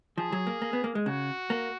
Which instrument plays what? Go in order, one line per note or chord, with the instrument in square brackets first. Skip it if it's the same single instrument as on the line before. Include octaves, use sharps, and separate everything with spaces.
[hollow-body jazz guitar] F3 [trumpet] G#4
[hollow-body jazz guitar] F#3
A#3
A#3
B3
A#3
G#3
[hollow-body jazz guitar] C#3 [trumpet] F#4
[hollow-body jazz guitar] A#3